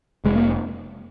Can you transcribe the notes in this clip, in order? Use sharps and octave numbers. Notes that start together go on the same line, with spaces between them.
F1 G#3
A#3